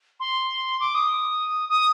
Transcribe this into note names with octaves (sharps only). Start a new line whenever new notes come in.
C6
D6
D#6
D#6